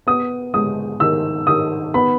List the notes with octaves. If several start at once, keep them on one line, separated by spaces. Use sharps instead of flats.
B3 D#6
G#3 D#6
D#3 E6
D#3 D#6
B3 B5